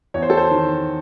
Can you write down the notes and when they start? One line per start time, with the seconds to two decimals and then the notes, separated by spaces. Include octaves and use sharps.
0.14 E2 C#5
0.22 C5
0.30 A4
0.38 C5
0.51 D#3